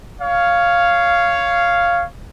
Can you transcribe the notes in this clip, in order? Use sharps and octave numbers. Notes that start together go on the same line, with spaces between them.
C#5 F5